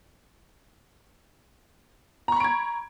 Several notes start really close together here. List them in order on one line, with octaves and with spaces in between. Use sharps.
A#5 C#6 B5 D7 G#6